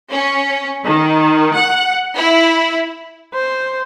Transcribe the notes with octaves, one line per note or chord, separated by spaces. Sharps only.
C#4
D#3
F#5
E4
C5